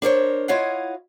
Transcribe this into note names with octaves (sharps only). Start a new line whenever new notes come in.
D4 A#4 C5 C#5
E4 F4 C#5 D#5 F5 F#5